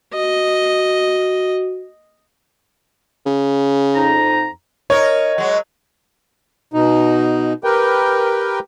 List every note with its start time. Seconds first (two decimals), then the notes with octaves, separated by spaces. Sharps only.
0.14 F#4 D#5
3.26 C#3
3.95 F2 D#4 A#5
4.90 D#4 A#4 C#5
5.38 F#3 G#3
6.74 B2 D#4
7.64 G4 A#4 B4 G5